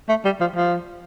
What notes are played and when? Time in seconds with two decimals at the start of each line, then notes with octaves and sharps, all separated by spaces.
0.09 A3
0.25 G3
0.40 F3
0.56 F3